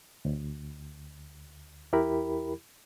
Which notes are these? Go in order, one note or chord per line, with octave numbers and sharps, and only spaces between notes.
D2
E2 E4 G4 A#4 B5